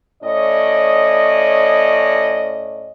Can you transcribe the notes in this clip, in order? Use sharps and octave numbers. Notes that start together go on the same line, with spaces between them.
A2 C#4 D5 D#5